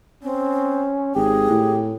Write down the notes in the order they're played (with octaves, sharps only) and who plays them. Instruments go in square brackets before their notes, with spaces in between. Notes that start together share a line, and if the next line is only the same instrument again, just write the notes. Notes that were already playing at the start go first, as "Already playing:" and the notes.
[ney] C4 [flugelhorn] C#4
[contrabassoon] G#1 [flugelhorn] G4 [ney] G#4
[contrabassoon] A2